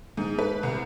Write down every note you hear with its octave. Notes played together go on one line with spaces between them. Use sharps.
G#2
B4
C2